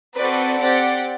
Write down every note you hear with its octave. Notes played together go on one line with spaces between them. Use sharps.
C4 F#4 A4 B4 D5
C4 G4 D5 F#5